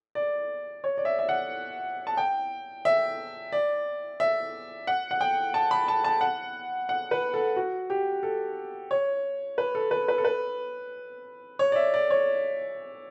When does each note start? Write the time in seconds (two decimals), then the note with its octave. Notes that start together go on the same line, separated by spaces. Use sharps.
0.15 D5
0.84 C#5
0.97 D5
1.05 E5
1.19 E5
1.29 F#5
2.07 A5
2.17 G5
2.85 E5
3.52 D5
4.20 E5
4.87 F#5
5.11 F#5
5.21 G5
5.54 A5
5.71 B5
5.88 A5
6.04 A5
6.21 F#5
6.89 F#5
7.11 B4
7.34 A4
7.56 F#4
7.90 G4
8.23 A4
8.91 C#5
9.58 B4
9.75 A4
9.91 B4
10.08 B4
10.18 A4
10.25 B4
11.59 C#5
11.72 D5
11.76 E5
11.94 D5
12.10 C#5